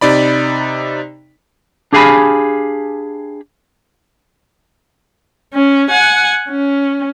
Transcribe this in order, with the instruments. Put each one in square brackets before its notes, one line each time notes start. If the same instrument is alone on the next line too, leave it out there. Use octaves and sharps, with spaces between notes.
[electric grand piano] C3 D#4 D5 B5
[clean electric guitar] D4 G4 G#4 F5 G#5 B5
[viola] C#4
F#5 G#5
C#4